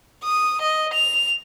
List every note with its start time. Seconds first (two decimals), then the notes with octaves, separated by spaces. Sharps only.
0.24 D#6
0.61 D#5
0.94 F7